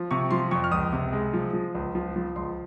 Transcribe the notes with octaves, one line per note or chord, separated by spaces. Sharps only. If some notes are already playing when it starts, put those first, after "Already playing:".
Already playing: F3
C3 C#6
F3 C6
F2 C#6
F6
C#2 D#6
C3
G#3
F3
F3
C#2
F3
F3
C#2 C6